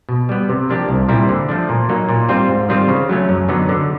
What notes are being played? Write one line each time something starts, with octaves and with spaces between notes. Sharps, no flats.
B2
G3 B3
C3
F3 A#3 D4 G4
C2
A#2 G3 C4 E4
D3
F3 A3 D4
A#2
F#3 A#3 D#4
A#2
G3 C4 F4
G#2
D#3 G3 C4 F4
C#3
F#3 A3 C#4
F#2
D3 F#3 B3 D#4
D3